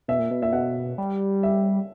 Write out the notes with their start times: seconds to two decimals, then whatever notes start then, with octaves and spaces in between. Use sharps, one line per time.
0.08 B2 E5
0.19 A#2
0.31 B2
0.42 A#2 E5
0.53 B2 F#5
0.98 G3
1.43 E5